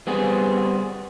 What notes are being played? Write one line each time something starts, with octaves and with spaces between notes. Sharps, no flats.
G3 B3 C4 G#4